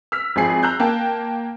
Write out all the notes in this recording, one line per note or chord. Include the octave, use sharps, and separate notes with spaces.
E6 F6 B6
G#1 F3 G#4 C7
A#5 E6 F#6 G6
A#3 G5 A5